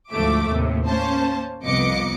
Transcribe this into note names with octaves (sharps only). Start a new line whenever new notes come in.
D2 G#2 F3 A3 E5 D6
D#2 A2 C3
A#3 C#4 C5 A5
C2 F2 B3 D#5 D6 C#7